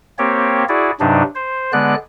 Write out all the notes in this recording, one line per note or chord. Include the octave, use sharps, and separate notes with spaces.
A#3 C4 G4 C#5
E4 F#4 G#4 D5
G2 C3 F#3 D4 D#4
C5
D3 G#3 B3 D5 F#6